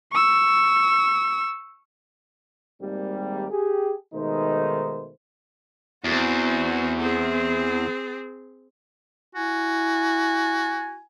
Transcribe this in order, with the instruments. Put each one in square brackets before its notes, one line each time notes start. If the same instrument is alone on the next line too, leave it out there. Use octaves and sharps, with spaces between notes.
[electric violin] C#6 E6
[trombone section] G#1 G3 A#3
G4 G#4
B2 D#3 G#3 A3 D#4 C5
[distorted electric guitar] E2 [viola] C4 F#4
[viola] C4 G#4
[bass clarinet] E4 [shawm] F#4 [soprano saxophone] G#5